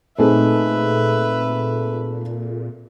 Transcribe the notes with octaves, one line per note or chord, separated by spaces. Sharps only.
A#2 A3 C4 D#4 G#4 A4 B4 E5